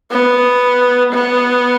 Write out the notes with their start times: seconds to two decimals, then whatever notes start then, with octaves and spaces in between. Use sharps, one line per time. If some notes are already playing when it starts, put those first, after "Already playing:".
0.11 B3
1.13 B3